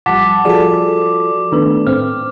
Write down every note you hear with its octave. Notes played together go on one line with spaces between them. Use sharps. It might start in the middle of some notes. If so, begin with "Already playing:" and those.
A1 F3 G3 F#5 A5 D6 B6
F3 F4 F#4 G#4 A4 D5
D#3 A3 B3 D4 B4
A2 C4 F6